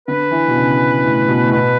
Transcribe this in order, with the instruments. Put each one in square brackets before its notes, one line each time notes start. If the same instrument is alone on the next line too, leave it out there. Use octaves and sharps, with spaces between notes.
[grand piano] D3 [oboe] B4
[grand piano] E3
B2
C#3
A2
B2
A2
[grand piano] B2 [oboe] B4